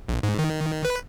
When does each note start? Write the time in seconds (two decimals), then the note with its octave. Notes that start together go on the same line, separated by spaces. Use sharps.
0.09 A#1
0.23 G#2
0.39 D#3
0.85 B4